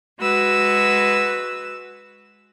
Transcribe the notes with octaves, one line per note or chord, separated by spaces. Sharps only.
G#3 F#4 B4 E6